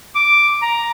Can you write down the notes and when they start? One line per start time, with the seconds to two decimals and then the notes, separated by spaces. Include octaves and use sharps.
0.15 D6
0.62 A#5